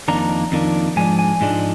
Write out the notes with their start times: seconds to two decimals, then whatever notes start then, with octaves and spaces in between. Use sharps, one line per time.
0.08 F2 D#3 A#3 D4 A#5
0.52 F2 D#3 A#3 D4
0.96 G#2 F3 G#3 D4 G#5
1.19 G#5
1.41 G#2 F3 G#3 D4